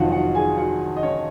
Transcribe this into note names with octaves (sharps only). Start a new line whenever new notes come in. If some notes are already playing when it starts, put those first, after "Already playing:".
Already playing: F1 F2 D#3 F#3 F4 F#4 F5 F#5
F#4 F#5
G#4 G#5
F#4 F#5
D#5
C#4 C#5